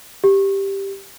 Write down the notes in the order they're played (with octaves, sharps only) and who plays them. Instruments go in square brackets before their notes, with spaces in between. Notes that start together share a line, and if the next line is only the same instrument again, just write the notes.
[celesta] G4